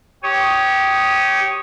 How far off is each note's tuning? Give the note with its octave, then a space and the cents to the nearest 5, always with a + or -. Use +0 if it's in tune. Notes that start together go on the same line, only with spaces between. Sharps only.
G4 -20 C#5 +0 D#6 +0